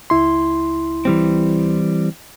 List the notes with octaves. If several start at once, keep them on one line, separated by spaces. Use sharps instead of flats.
C#2 E4 C6
E3 G3 C4